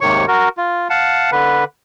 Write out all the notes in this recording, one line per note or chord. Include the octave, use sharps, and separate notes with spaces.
D#2 G#2 C3 D#3 C#5 C#6
F#4 A#4
F4
F5 F#5 A5
D3 B4